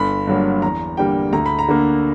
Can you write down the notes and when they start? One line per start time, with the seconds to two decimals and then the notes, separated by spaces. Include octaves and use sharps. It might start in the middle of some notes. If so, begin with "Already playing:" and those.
Already playing: G1 B5
0.27 G2 D3 F#3 A#3
0.62 E2 A#5
0.97 D3 G3 A#3 G5
1.33 D2 A#5
1.46 B5
1.59 A#5
1.68 D3 A#3